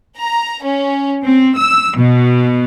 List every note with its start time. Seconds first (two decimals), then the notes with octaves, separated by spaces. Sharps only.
0.18 A#5
0.63 C#4
1.24 C4
1.55 E6
1.95 B2